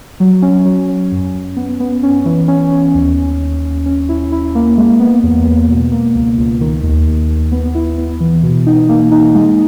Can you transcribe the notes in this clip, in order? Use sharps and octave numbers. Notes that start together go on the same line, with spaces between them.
F#3
C#4
F#3
C#4
F#2
F#2
B3
B3
C#4
E3
C#4
C#4
D#2
D#2
D#2
D#2
C#4
E4
E4
A#3
G#3
B3
E2
B3
B2
A#3
C#2
C#2
D#3
D#2
D#2
D#2
B3
E4
B3
E3
B2
D#4
A#3
D#4
G#3